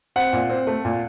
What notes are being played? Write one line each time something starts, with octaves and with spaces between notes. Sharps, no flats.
C4 F#5
A#2
C4
A3
A#2